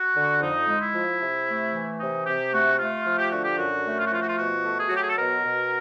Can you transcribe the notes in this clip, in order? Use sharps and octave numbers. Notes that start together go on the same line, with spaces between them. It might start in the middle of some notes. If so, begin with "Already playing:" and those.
Already playing: F#4
D3
F2 D#4
G#3
E4
F3
C3
A3
E3
C3 D#4
C3 G4
A3 F#4
A3 F4
F3
G4
D3 F#4
G4
F#2 F#4
A3
F4
F#4
F3 F4
F#4
F4
B2 F#4
A3
G#4
F#4
F#3 G4
G#4
A4
B2 A#4
B2